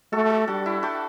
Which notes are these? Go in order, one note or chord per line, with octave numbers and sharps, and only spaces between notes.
A3 F#4 A4
F#4 A4
G3 D4 F#4
E4
D4 F#4